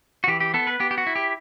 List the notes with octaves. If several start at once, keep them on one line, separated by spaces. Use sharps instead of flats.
F#4
E3 G4
G4
B3 A4
B4
B3 G4
G4
F#4
E4
G4